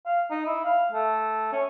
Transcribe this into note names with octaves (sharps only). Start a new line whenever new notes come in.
F5
D#4
E4
F5
A3
C#4